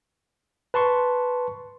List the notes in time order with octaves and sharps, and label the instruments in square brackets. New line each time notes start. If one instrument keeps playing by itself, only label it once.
[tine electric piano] B4 A5 C6 C#6